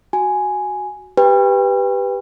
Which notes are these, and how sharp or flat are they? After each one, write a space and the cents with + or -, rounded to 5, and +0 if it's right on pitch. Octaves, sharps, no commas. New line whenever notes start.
F#4 +5 G#5 +0
G4 +0 B4 +0 G5 +35